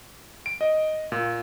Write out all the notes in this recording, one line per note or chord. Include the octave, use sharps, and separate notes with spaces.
D7
D#5
A#2